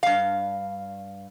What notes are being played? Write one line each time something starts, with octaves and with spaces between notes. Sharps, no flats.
G2 F5